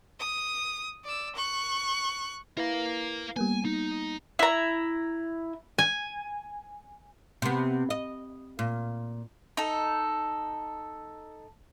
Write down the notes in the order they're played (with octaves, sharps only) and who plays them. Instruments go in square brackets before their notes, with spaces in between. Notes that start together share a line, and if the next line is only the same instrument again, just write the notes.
[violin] D#6
D5 E6
C#6 F#6
[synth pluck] E4 B4 [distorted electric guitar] A#4 F5
[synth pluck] G3 A#3 B3 [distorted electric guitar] G#5
[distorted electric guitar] D#4
[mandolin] E4 A#5
[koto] G#5
[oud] C3 B3
D#5
A#2
[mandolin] D#4 A4